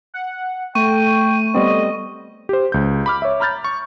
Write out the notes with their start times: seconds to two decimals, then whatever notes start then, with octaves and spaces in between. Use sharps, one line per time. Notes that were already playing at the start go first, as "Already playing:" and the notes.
0.14 F#5
0.75 A3 G5 C#6 D#7
1.55 G3 B3 C4 D#5
2.49 G4 C5
2.72 C#2 G6
3.06 B5 D6 F6
3.22 C#5 E5
3.40 A#5 B5 F6 G6 A6
3.64 C#6